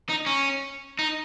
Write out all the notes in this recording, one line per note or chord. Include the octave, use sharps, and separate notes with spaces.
D#4
C#4
D#4